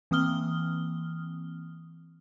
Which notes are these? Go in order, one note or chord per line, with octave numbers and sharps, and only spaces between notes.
E3 A#3 C4 D#6 F6 G7